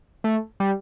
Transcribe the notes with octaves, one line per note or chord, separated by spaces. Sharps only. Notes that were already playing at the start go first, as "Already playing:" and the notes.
A3
G3